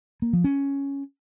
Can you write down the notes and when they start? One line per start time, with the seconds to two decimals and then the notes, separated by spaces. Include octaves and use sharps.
0.22 A#3
0.33 F3
0.44 C#4